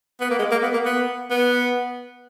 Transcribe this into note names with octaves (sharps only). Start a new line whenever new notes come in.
B3
A#3
G#3
A#3
B3
A#3
B3
B3